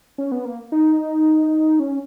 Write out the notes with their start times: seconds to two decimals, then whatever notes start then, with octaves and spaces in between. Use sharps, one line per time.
0.18 C#4
0.32 B3
0.45 A#3
0.72 D#4
1.80 C#4